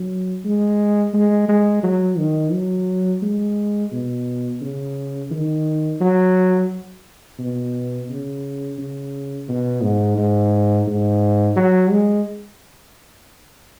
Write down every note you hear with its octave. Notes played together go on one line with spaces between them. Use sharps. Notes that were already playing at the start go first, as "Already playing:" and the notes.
Already playing: F#3
G#3
G#3
G#3
F#3
D#3
F#3
G#3
B2
C#3
D#3
F#3
B2
C#3
C#3
B2
G#2
G#2
G#2
F#3
G#3